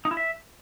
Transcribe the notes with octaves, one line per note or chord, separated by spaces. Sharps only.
D#4
E4
E5